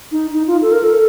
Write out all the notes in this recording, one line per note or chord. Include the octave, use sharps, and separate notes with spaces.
D#4
D#4
F4
A4
A#4
A4